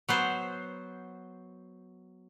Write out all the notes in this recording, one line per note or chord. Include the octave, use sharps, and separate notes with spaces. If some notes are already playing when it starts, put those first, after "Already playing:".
F#3 B3 C5